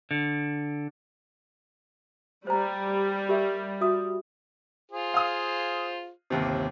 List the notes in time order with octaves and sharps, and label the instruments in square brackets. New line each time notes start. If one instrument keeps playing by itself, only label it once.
[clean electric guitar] D3
[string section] G3 [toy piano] C5 A#5
[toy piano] G4 A#4 E5
F#4 E5 D#6
[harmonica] F4 G#4 C5
[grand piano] F5 D#6
G1 D#2 C3